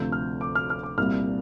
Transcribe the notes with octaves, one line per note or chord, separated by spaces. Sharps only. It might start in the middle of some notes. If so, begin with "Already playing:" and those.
Already playing: D2 C3 F3 G6
F6
D6
F6
F6
D6
C2 A#2 G3 F6